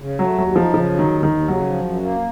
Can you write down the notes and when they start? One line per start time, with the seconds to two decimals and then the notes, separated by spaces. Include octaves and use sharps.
0.02 C#3
0.19 F#3 A3
0.38 D#2 F#3
0.56 F3 D#4
0.74 C#3 F3
0.93 F#3
0.99 D#3
1.11 D#2
1.23 D#3
1.30 D#2
1.48 C#3 F#3
1.66 F3
1.84 F#2
2.03 A#3